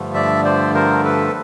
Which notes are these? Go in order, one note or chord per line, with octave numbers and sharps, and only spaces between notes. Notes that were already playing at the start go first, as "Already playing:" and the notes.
Already playing: G2 D3 F3 A3
D5 E5
C5 D5
A#4 C5
A4 B4